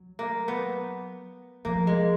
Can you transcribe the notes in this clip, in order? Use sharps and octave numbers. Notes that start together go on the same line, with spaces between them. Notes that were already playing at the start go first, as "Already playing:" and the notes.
Already playing: F#3
A#3
B3
F3 A#3
G#3